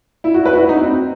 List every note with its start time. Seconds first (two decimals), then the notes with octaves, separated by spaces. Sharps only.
0.24 E4
0.34 F#4
0.45 B4
0.53 F#4
0.57 E4
0.69 D#4
0.81 C4